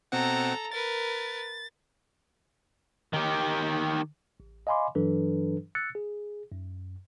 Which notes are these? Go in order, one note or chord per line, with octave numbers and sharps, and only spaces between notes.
B2 C4 A4 F#5 A#5
A#4 B4 A6
D#3 G4
A1
D#5 F5 G#5 B5 C6 D6
G2 E3 F#3 D4 A4 B4
E6 F#6 A6 C#7
G#4
F#2